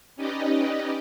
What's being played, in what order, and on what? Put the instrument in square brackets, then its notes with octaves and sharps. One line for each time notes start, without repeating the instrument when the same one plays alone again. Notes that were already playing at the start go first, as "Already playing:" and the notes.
[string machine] C#4 D#4 G4 B4 D5 D#5